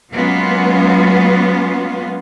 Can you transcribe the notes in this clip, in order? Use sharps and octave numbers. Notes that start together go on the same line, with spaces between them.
F#3 G#3 A#3 B3 C#4 F4